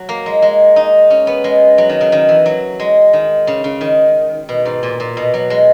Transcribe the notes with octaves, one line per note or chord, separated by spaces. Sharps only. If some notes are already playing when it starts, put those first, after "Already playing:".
Already playing: F#3
A#3
G#3
G#3
D#4
C#4
B3
G#3
F#3
D#3
C#3
D#3
E3
F#3
G#3
D#3
C#3
C#3
D#3
B2
G#2
A#2
A#2
B2
F#3
G#3